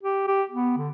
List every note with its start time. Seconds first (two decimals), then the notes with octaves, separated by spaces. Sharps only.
0.03 G4
0.27 G4
0.51 B3
0.77 D3